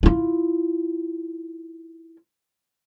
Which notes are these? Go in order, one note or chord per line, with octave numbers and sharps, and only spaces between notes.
E4 F4